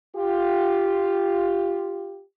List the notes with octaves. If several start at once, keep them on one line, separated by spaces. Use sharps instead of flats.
F4 G4